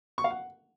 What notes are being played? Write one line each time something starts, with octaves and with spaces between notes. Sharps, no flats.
C#6
F5
F#5